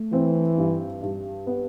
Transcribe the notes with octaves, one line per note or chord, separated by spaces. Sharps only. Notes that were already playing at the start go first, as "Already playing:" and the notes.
Already playing: A3
E3 C4
G2
G2
B3